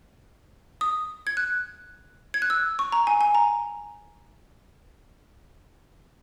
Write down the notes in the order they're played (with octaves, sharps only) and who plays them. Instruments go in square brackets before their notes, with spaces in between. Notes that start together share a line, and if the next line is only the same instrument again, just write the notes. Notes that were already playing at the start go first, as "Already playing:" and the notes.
[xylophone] D#6
G#6
F#6
G#6
F#6
E6
C#6
A#5
G#5
G#5
A#5